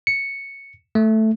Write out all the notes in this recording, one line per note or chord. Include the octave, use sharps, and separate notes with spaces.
C#7
A3